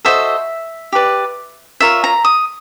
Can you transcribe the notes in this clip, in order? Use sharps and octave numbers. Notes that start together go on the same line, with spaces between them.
F#4 A4 C5 D#5 E5
G4 B4 D5
F4 A#4 C#5 E5
A#5
D#6